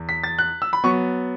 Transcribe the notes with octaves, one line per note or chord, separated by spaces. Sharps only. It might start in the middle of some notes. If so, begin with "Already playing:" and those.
Already playing: E2
B6
A6
F#6
E6
B5
F#3 B3 C#6